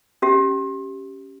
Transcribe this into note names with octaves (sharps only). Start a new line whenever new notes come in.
C#4 G4 E5